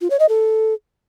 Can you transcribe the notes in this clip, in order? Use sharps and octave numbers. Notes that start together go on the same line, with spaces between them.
F4
C#5
D#5
A4